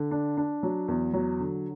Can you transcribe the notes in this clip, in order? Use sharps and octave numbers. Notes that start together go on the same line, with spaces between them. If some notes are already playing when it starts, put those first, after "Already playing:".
Already playing: D3
D4
D4
F#3
E2
F#3
D3